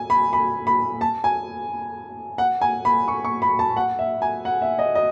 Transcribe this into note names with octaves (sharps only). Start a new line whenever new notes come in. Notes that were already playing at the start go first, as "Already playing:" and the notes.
Already playing: G#5
B5
B5
B5
A5
G#5
F#5
G#5
B5
C#6
C#6
B5
A5
F#5
E5
G#5
F#5
E5
D#5
D#5